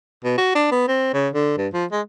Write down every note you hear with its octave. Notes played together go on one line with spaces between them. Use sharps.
B2
F#4
D4
B3
C4
C#3
D3
G2
F3
G#3